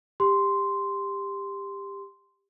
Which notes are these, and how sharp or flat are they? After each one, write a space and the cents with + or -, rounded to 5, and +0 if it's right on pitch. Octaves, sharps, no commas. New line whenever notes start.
G4 +20 C6 -5